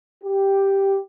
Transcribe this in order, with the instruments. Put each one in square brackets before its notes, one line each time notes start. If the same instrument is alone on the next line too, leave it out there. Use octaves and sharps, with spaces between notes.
[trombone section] G4